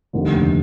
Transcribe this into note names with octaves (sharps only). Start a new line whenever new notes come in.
F1 D#2 D3